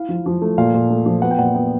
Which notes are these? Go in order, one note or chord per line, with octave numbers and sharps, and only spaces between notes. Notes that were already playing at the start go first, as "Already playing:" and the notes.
Already playing: E4 F5
F3
F3
A3
A#2 F5
A#2
A3
F3
B3 F#5
G5
A#2 F#5
B3 G5